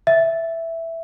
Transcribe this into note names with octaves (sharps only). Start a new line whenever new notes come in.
E5